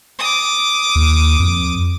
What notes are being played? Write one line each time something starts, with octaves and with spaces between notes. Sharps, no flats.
D6 D#6
D#2
F2